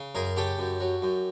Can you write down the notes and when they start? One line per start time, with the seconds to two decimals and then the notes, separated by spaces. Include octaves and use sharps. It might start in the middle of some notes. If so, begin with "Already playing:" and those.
Already playing: C#3
0.15 F#2 G#4 A#4
0.36 C#3 G4 A4
0.59 F#2
0.80 F#3
1.02 F#2